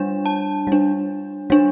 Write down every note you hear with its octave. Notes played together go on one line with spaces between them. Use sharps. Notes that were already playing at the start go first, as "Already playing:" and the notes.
Already playing: G3 D4
A5
G3 D4
G3 D4